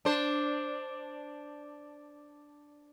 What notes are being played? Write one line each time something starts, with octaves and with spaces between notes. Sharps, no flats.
D4 C5